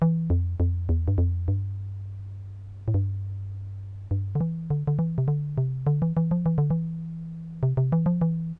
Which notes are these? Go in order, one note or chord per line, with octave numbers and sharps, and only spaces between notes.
E3
F2
F2
E2
G2
F2
G2
A2
G2
G2
D3
E3
D3
D3
E3
C3
D3
C3
D3
E3
E3
F3
E3
D3
E3
C3
C3
E3
F3
E3